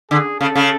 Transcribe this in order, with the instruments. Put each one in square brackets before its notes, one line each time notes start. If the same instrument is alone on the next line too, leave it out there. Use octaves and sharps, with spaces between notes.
[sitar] D3 [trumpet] G#4
[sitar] C#3 [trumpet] A4
[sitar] C#3